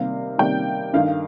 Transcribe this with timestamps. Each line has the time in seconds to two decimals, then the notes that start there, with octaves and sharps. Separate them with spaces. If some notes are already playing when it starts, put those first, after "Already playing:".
Already playing: C3 D#3 G3 A#3 F5
0.38 C3 D#3 G3 A#3 G5
0.93 G2 D#3 A3 F5